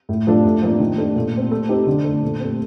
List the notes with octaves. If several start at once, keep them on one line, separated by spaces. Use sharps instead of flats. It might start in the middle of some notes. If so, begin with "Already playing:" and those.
A2
F3 A3 D4
A2
F3 A#3 D4
D#3
A3 D4 A4
A#2
A3 C4
A3
C4 D#4 G4
D3
A3 D4
A#2
A3 C4